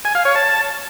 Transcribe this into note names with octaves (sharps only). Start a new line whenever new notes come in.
G#5
F5
C#5
A5